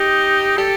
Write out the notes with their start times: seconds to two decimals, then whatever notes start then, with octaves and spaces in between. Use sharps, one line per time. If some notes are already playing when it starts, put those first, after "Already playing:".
Already playing: D#4 G4
0.58 G4 A4